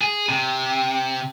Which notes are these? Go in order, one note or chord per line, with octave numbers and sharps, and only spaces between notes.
G#4
C3